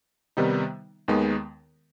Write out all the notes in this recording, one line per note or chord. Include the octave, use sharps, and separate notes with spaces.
C3 D#3 G3 B3 D#4
D#2 D#3 G#3 B3